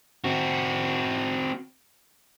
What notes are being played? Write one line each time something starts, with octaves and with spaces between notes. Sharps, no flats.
C4 F#4